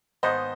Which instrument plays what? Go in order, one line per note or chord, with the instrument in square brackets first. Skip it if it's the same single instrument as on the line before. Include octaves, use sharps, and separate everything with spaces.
[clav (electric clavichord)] G#2 D#3 B3 D#4 [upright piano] C5 D#5